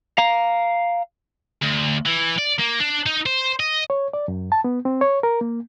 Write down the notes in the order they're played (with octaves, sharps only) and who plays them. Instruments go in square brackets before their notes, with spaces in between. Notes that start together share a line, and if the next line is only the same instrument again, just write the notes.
[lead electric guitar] F5 A#5
[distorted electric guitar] D2
E3
D5
A#3
D4
D#4
C5
D#5
[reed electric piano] C#5
D5
F#2
A5
B3
C4
C#5
A#4
A#3